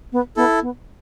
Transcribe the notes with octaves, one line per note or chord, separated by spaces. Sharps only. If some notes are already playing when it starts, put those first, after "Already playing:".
B3
B3 E4 A4
B3